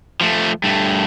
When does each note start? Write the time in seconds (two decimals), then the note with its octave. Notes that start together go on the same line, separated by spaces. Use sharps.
0.21 F3 A3
0.64 G2 A3